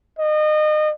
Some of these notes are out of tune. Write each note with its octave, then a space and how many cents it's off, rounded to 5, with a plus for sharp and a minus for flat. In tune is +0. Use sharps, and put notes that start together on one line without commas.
D#5 -30